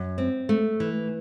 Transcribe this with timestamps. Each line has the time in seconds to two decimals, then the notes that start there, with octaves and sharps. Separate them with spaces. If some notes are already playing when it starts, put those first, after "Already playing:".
Already playing: F#2
0.18 C4
0.49 A3
0.80 E3